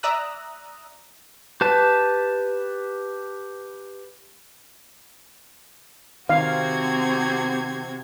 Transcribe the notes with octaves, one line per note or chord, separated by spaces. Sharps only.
D5 E5 A#5 D#6 E6 F#6
G4 B4 A5
C3 D#3 C4 F#4 F5 G#6